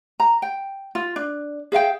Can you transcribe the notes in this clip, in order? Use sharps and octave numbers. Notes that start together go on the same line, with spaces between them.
A#5
G5
F4
D4
G#4 E5 F5 G5